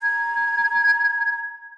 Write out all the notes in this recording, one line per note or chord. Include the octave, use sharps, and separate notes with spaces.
A#5 G#6